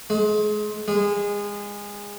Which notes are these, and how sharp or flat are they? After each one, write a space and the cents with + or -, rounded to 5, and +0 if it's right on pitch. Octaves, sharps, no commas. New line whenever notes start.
G#3 +25
G#3 -25